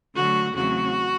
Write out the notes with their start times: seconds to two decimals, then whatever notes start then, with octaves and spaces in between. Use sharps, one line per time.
0.15 D3 F#3 A3 F#4
0.54 E2 C#3 F#3 A3 C4 F#4